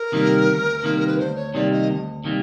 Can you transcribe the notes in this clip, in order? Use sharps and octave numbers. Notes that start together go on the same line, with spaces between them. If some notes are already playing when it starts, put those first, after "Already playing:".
Already playing: A#4
C3 D#3 G3 A#3
D2
C3 D#3 G3 A#3
B4
D2 C5
C#5
C3 D#3 G3 A#3 D5
D#5
D2
C3 D#3 G3 A#3